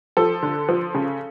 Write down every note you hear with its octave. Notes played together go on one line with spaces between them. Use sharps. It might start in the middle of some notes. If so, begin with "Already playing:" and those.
F3 A4
D3
F3
C#3